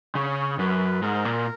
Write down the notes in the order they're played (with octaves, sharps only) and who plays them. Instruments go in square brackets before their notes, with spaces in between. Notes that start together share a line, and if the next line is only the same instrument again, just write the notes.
[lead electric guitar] C#3 [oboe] C#5
[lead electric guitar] F#2 [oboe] B4
[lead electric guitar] G#2 [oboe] A#4
[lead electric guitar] A#2